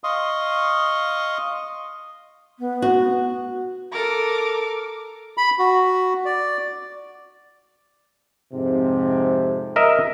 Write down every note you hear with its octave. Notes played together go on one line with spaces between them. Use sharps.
D#5 F5 C6 C#6 D#6
B3
F#4
A4 A#4 D6
B5
F#4
D5
F2 G#2 C3
A#4 D#5 E5